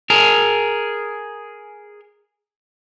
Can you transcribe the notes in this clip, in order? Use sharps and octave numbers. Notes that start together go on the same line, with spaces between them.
G#4 A#4